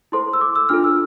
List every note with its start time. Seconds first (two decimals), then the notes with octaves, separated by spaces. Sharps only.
0.12 E4 A4 C5 C6
0.33 E6
0.41 D6
0.56 E6
0.69 D4 F4 A4 F6
0.84 E6